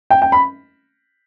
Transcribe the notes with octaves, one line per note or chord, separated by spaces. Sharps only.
G5
G5
B5